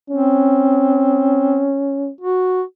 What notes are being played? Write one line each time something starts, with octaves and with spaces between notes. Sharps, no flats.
C4 C#4
F#4